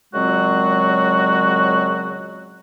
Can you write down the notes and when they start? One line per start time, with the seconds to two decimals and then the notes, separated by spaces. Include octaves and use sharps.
0.13 A#2 C#3 F#3 G#3 C4 F#4